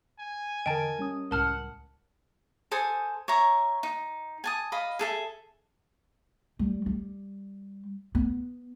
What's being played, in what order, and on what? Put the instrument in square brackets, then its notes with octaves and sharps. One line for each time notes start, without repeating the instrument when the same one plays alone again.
[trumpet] G#5
[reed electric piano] E2 D3 A6 [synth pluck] A#4 D#5 [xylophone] G5 A5
[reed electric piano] G3 C#4 D#6
[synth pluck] C#2 A2 [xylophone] A#4 A5 F6 [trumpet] F#5
[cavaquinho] A4 C5 G#5 D#6
C#5 E5 A#5
D#4
G#5 A5 D#6
D#5 F5 B5
G#4 A4 E5
[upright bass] G3
G3
B3